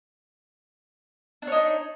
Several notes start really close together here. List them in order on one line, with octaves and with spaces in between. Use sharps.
D4 C#5 D#4